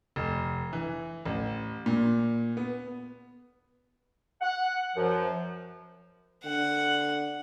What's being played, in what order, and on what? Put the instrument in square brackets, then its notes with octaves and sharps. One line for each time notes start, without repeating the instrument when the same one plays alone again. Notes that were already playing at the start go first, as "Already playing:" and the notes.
[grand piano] F1
E3
A1
A#2
B3
[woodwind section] F#5
F#2 F3
[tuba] D3 [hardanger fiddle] F#5